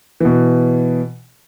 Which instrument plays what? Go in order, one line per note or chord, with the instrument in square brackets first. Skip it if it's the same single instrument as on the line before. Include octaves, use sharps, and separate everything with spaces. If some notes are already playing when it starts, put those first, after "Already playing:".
[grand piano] B2 E3